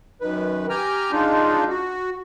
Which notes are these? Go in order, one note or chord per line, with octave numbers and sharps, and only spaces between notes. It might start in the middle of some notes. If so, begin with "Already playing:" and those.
F#2 D#3 B4
G4 G5 G#5 A#5 F6
G#3 D4 D#4 F4
F#4